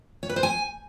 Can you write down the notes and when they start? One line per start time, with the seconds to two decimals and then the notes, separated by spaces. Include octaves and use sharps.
0.23 C#5
0.29 B4
0.36 C5
0.43 G#5